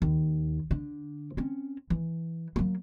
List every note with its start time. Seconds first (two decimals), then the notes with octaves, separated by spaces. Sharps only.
0.02 D#2
0.71 D3
1.37 C4 C#4
1.90 E3
2.56 F#3 A#3